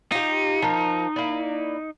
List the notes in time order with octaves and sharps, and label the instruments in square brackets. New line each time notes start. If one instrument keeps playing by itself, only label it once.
[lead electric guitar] D#4 [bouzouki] F4 G4
[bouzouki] F3 A#4
A#3 E4 D5